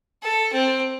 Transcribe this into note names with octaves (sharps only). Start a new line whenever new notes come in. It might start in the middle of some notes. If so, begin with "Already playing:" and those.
A4
C4